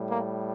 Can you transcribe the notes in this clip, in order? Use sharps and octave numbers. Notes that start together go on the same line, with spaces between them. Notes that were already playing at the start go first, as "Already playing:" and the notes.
Already playing: A2 G3
A#3